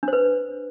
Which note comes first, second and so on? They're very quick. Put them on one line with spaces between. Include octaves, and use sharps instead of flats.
D4 C5 B4